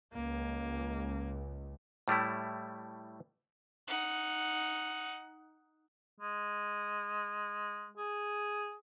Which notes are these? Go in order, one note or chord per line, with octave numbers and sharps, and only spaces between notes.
C#2 A#3
A2 G3 A3 E4
D#4 F#5
G#3
G#4